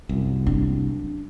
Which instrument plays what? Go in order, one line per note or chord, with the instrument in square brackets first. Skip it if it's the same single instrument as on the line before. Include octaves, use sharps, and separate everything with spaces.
[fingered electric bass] C2 F#2
[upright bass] D4